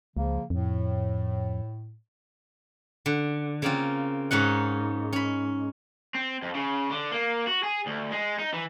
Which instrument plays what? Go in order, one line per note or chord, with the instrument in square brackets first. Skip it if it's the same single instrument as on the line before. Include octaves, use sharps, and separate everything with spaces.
[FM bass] C#2 [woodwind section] C#3 F3 A#3
[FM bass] F2 [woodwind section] A2
[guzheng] D3
C#3 A#3 C4 F4
G#2 C#4 D#4 F#5
C#4 B5
[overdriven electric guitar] C4
F2
C#3
D3
A#3
F#4
G#4
D2
G#3
D#4
E3